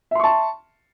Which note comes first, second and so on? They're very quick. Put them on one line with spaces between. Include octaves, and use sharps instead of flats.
E5 C6 C#6 A5